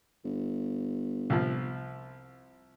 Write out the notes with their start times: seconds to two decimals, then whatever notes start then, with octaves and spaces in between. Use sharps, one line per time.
0.24 G1
1.30 C2 F3